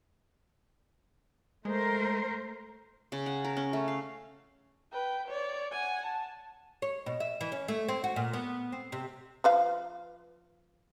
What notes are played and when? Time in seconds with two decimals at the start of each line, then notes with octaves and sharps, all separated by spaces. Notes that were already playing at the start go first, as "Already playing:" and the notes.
1.65 G#3 A3 A#4 C5
3.12 C#3
3.26 F#5
3.44 A#4
3.57 C#4
3.73 A3
3.88 F5
4.92 B4 G5
5.28 C#5 D5
5.71 F#5 G#5
6.06 A5
6.82 C#5
7.06 B2
7.20 E5
7.41 E3
7.52 C#4
7.68 A3
7.89 C4
8.04 F#4
8.16 A#2
8.33 B3
8.72 C4
8.92 C3
9.44 F3 B4 F5